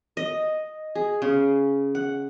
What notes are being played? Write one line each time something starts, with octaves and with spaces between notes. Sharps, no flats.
D#5
G#4
C#3
F#5